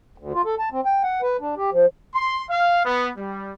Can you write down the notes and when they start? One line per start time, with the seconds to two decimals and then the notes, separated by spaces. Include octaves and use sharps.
0.18 D2
0.34 F4
0.45 A4
0.59 A5
0.72 C4
0.85 G5
1.03 F#5
1.22 B4
1.41 D4
1.57 G4
1.72 F3
2.15 C6
2.50 F5
2.85 B3
3.17 G3